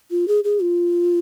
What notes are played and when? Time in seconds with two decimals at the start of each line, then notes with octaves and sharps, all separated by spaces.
0.11 F4
0.28 G#4
0.44 G#4
0.62 F4